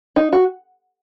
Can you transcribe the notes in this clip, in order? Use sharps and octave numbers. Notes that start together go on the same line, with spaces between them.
D#4
F#4